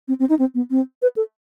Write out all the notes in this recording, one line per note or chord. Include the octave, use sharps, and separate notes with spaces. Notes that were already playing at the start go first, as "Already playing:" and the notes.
C4
C4
D#4
C4
B3
C4
B4
A4